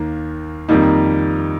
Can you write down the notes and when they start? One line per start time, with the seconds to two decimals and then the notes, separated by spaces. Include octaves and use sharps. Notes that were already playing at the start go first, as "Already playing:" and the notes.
Already playing: D#2 D#3 A#3
0.69 F2 D#3 G3 A#3 D#4